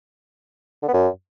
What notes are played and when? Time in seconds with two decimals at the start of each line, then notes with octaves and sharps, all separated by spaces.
0.83 D3
0.88 B3
0.93 F#2